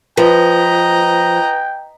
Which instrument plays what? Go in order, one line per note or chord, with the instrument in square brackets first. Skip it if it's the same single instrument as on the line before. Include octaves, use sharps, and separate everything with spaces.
[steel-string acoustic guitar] F3 [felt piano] B4 [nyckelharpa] D#5 A#5 [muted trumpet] G5